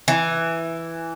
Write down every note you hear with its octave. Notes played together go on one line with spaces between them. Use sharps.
E3